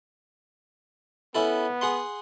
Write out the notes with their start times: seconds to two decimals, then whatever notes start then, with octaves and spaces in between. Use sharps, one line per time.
1.35 B3 C#4 E4 A4
1.81 G#4 F#5 C6